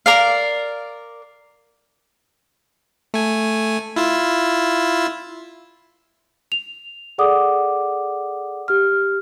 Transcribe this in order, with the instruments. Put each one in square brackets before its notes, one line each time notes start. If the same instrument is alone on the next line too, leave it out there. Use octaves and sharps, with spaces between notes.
[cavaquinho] A#4 D5 F5
[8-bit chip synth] A3 G#5
E4 F4 E6
[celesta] F7
G#4 A4 D5 F#5 D6 D#6
G4 F6